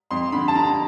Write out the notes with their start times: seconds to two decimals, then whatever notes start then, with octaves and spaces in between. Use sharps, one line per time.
0.11 F2 C6
0.32 D3 B5
0.48 A5
0.55 D3 A#5